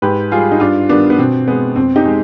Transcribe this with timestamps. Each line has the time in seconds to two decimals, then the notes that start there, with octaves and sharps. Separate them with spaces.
0.02 G#2 G4 B4
0.31 G3 F4 G#4
0.52 D#4
0.60 G2 D4 F4
0.89 D#3 G3 B3 D4
1.10 B3
1.18 B2 C4
1.47 G#3 B3
1.76 F2 C4
1.96 D#4 G4
2.05 G#3